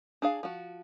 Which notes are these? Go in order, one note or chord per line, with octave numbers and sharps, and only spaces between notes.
D4 G#4 F5
F3 F#4